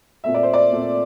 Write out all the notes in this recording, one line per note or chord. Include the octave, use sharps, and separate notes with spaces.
A#2 A3 C4 E5
D5
C5
D5
A#2 A3 C4